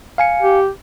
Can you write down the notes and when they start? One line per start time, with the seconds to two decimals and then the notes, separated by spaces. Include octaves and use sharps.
0.18 F5 G#5 C#7
0.42 G4